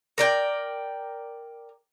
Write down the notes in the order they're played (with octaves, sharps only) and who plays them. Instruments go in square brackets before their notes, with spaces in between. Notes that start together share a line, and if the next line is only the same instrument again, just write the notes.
[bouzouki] A#4 D5 G5